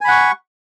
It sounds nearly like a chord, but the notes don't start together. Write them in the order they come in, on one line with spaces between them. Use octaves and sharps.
G#5 B5 F#5 C#6